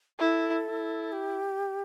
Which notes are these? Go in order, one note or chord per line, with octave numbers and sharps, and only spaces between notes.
E4 A4
E4
G4